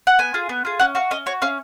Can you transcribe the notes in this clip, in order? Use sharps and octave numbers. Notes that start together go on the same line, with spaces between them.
F#5
B3 G#5
F4 G#4
B3
F4 G#4
C#4 F#5
F#4 F5
C#4 D#5
F#4 C#5
C#4 F5